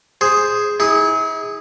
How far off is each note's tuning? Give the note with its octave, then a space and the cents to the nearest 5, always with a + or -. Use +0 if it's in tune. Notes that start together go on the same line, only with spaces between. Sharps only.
G#4 +0 C5 +0
E4 -45 G#4 -10